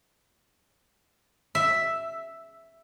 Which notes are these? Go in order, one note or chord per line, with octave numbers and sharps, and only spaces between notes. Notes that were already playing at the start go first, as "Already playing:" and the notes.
E5